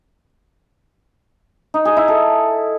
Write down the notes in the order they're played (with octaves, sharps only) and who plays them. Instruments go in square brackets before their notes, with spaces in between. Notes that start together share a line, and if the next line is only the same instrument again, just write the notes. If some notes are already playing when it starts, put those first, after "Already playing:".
[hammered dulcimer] D#4
G#4
E4
A4